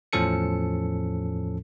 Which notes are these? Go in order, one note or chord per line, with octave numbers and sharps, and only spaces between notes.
E2 A2 F3 C#4 A4 C#7